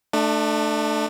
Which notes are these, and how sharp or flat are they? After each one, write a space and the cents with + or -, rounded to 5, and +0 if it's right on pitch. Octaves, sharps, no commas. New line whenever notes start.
A3 +0 D4 +30